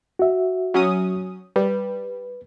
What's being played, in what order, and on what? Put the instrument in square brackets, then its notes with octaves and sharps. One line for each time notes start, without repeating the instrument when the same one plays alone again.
[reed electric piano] F#4 E5
[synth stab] F#3 C#4 D#6
[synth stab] G3 [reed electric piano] B4